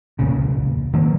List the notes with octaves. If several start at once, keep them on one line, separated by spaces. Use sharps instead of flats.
E1 C#2 A#2 C#3
D#3 F#3 A#3